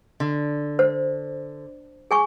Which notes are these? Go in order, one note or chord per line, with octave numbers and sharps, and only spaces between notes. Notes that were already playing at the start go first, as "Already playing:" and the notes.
D3
C5
G#4 G#5 C#6